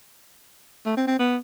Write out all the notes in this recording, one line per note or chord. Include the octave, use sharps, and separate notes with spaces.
A3
C4
C4
B3